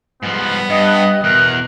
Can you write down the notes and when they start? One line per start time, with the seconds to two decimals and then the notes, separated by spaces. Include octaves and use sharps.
0.23 G#2 F3 G3 B3
0.70 G2 D#5
1.24 E2 B2 A#4 F#6